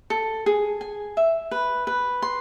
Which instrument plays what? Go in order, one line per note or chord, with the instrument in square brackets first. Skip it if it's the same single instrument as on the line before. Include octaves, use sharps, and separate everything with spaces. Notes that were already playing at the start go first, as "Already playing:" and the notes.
[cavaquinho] A4
G#4
G#5
E5
B4
B4
C6